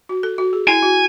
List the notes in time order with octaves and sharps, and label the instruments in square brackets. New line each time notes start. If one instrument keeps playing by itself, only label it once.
[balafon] F#4
A4
F#4
G#4
[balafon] E4 [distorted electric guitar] G#5
[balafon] F#4